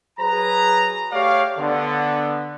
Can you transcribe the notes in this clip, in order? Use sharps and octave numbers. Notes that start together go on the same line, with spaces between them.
F#3 G#4 B4 A#5
A3 G4 C#5 D5 F5
D3 B3